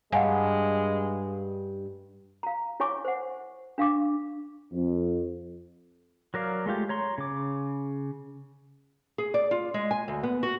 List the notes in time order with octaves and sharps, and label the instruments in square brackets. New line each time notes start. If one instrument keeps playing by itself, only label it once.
[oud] G2 [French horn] G#3 [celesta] D#5 F5 [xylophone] F#5 G#5
[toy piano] F5 A#5
E4 C#5 G#5 C#6 D6
C5 F#5
D4 F5 C#6 D6
[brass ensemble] F2
[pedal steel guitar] F#3 A#4 D5 F5
G#3 A3 F4 G4
C#5 A#5 C6
C#3 D6
[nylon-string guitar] G#4
D5
F4
G#3
G#5
D2
B3
F#4